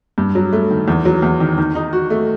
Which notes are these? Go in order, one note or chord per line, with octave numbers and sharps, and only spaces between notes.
G2
F#3
A3
D#3
E2
F#3
E2
D#3
D#3
D#4
F#4
A3